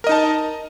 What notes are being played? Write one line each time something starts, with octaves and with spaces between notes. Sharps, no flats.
D#4 A#4 D#5 A5